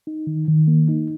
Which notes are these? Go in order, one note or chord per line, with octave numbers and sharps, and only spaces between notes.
D#4
D#3
D#3
A#3
D#4